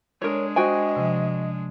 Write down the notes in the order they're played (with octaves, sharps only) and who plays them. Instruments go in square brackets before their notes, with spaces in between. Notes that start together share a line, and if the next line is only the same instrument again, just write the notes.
[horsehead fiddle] G#3 D4 [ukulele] A#4 C#5
[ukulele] F#4 G5 G#5 [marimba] C5 [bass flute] D#5
[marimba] C3 F3